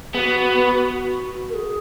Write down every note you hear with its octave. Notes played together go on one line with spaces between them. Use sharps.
B3 F#4 G#4
F#4
A#4
G#4